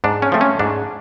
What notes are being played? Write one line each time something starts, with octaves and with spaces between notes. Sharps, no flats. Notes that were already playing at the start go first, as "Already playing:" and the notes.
G#2 D4
C#4
F3 A3 C4
C#4
G#2 D4